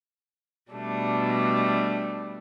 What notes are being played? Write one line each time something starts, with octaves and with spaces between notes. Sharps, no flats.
B2 G3 A3 D4